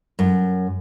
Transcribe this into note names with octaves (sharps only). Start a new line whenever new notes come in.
F#2